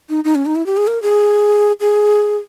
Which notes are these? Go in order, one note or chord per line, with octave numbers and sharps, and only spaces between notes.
D#4
D#4
C#4
D#4
E4
G4
G#4
A#4
G#4
G#4